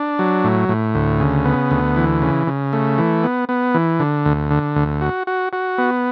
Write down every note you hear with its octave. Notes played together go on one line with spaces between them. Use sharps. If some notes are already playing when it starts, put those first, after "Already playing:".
Already playing: D4
F#3
A2
A2
D2
C#3
B3
D2
E3
C#3
C#3
A3
E3
B3
B3
E3
D3
D2
D3
D2
F#4
F#4
F#4
B3